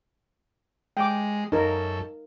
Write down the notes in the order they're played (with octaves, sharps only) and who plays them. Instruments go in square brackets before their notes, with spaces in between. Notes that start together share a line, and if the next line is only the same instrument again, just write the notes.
[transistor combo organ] G#3 [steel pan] G5 D6
[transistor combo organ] F#2 A4 [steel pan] D#4 A#4